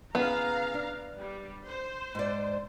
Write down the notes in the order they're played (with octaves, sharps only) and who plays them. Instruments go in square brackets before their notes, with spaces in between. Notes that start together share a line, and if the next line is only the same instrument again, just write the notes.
[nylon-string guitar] C#3 E4 G#4 [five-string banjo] B3 [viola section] F5 A#5
[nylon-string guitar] D4
[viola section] G3
C5
[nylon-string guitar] G#2 D5